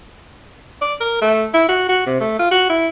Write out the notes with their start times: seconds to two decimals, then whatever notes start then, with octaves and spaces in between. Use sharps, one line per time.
0.82 D5
1.01 A#4
1.22 A3
1.54 E4
1.69 F#4
1.89 F#4
2.07 C3
2.20 A3
2.39 F4
2.51 F#4
2.70 E4